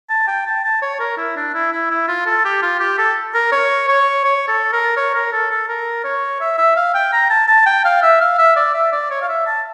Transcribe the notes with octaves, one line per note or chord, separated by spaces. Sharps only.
A5
G5
A5
A5
C#5
A#4
E4
D4
E4
E4
E4
F4
A4
G4
F4
G4
A4
A#4
C#5
C#5
C#5
A4
A#4
C#5
A#4
A4
A4
A#4
C#5
E5
E5
F5
G5
A#5
A5
A5
G5
F5
E5
F5
E5
D5
E5
D5
C#5
F5
E5
A5